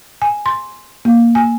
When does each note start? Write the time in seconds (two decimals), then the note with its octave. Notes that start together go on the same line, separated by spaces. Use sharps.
0.22 G#5
0.46 C6
1.05 A#3
1.35 G#5